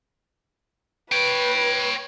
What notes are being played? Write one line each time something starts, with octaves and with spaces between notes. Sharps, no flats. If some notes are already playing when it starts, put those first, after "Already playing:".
B4 C#5 G5